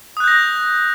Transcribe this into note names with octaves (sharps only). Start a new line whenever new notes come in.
D#6 F#6 G6 A#6